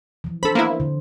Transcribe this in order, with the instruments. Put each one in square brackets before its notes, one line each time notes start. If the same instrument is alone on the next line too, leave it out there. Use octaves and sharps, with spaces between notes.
[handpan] E3 F3
[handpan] D4 C5 [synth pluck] A4 B5
[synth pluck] A#3 B3 E4
[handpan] D3